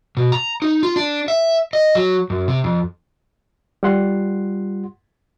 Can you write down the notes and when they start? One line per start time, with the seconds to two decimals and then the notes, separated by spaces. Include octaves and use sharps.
0.17 B2
0.32 A#5
0.62 D#4
0.83 F4
0.96 D4
1.28 E5
1.73 D#5
1.95 F#3
2.30 F#2
2.48 C3
2.64 F2
3.83 G3 F4 F#5 C6